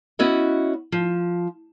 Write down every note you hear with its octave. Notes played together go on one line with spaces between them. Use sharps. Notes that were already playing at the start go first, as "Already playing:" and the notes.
B3 C#4 E4 F#4 C#5 D#5
F3